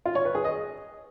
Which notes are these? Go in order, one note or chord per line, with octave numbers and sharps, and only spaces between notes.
F4
C#5
B4
G#4
D#5